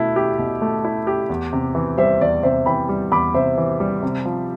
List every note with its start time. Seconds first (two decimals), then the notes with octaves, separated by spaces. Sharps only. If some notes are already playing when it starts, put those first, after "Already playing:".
Already playing: B2 A3 E4
0.16 G4
0.39 B2
0.62 A3
0.85 E4
1.07 G4
1.29 E2
1.53 C3
1.75 E3
1.98 G3 C5 E5
2.21 E2 D5
2.43 C3 C5 E5
2.66 E3 G5 B5
2.89 G3
3.12 E2 B5 D6
3.34 C3 C5 E5
3.58 E3
3.80 G3
4.03 C3
4.25 F3